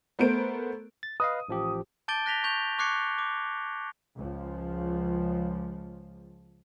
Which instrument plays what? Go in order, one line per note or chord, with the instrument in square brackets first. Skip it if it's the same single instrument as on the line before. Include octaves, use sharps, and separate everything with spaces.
[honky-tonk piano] A3 B3 A#4 C5 D7
[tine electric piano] A6
[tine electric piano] B4 D#5 F5 [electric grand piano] D#6
[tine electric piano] A1 F3 G4
[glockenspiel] A5 D6 G6 A6 D7 G7
F#6 A#6 B6 F7 G7
C#6 G6 F7 G7
C#6 D6 F#6 G#6 C7 C#7
D6
[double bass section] C#2 F3